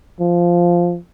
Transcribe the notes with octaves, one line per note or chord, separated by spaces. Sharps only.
F3